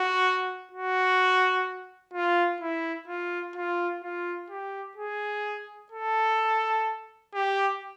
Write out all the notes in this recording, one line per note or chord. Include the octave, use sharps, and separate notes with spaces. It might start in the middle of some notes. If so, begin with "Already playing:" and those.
Already playing: F#4
F#4
F4
E4
F4
F4
F4
G4
G#4
A4
G4